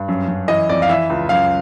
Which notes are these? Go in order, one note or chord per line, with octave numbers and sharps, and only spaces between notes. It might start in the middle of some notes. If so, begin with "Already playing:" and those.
Already playing: G2
F#2
F#2
E3 D#5
F2 D5
F5
E3 E5
C#2
F#2 F5